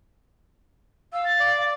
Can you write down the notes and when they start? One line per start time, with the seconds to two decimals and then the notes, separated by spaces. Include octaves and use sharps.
1.13 F5 E6
1.25 A6
1.40 D5